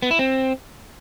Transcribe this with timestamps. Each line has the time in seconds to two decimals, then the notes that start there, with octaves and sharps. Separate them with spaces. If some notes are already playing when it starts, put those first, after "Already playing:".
0.02 B3
0.11 E4
0.19 C4